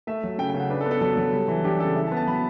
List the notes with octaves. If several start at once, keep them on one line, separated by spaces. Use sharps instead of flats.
A3 E5
F#3
C#3 G5
G5
C#3
F#5
D4 B4
A4
B3
A4
F#3 A4
F#3
G3
E3
D4 G4
C#3 A4
E4
A5
B3
A5
F#3 B5